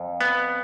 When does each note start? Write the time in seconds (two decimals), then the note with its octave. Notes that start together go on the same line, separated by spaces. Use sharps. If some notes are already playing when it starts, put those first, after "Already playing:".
Already playing: F2
0.21 B3